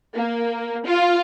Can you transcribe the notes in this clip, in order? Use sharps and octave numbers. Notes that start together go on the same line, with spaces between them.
A#3
F4